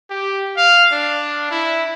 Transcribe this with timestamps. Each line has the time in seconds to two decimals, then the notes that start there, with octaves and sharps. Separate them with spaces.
0.10 G4
0.57 F5
0.92 D4
1.51 E4